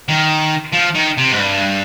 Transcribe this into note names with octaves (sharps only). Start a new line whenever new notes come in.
D#3
F3
D#3
C3
G#2
G2